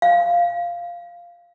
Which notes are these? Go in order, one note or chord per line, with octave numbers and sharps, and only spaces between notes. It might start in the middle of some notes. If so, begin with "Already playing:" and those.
F5